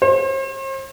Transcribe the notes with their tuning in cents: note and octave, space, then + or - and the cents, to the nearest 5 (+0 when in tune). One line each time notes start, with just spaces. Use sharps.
C5 +45